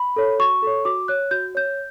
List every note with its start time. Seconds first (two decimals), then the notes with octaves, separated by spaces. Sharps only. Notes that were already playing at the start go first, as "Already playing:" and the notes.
Already playing: B5
0.16 A4 C#5
0.39 F#4 C#6
0.62 A4 C#5
0.85 F#4 D6
1.08 C#5 F#6
1.31 F#4 G6
1.55 C#5 G6